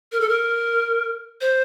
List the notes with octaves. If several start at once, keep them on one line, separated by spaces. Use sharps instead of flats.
A#4
A4
A#4
C5